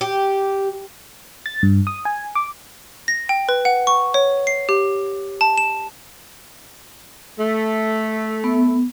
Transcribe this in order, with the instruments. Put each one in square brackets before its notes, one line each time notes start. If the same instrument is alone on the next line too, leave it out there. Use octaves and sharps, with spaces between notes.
[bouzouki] G4
[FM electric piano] A6
G2
D#6
G#5
D6
[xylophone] A#6
G5
B4
F#5
C#6
C#5
C7
G4
A5
E7
[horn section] A3
[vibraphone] B3